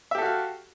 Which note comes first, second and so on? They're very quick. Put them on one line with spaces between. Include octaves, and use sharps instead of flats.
E5 G4 A4 F#4 F5